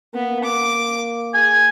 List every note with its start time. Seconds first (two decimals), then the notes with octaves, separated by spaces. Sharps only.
0.14 A#3 B3
0.44 D6
1.34 G#4 G#5